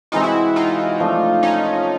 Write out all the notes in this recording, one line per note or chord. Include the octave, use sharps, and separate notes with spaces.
C3 E3 G#3 C4 D#4 F4
E4 F#4
D#4 F4
C3 F3 A3 D4
C#4 D#4